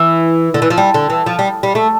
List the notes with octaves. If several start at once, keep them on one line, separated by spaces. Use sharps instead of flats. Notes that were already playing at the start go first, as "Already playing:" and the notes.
Already playing: E3
D3
E3
F3
G3
D3
E3
F3
G3
G3
A3